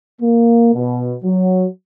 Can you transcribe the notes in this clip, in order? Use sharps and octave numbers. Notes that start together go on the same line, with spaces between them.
A#3
B2
F#3